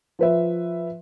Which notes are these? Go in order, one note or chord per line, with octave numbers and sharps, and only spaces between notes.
F3 B4 E5